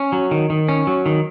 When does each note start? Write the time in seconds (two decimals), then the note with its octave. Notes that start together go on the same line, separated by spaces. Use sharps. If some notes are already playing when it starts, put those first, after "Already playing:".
Already playing: C#4
0.12 F#3
0.31 D#3
0.50 D#3
0.69 C#4
0.87 F#3
1.06 D#3